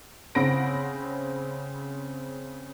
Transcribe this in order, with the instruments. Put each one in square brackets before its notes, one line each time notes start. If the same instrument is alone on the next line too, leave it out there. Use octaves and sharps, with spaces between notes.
[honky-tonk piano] C#3 C4 F#5 B5 A#6 D7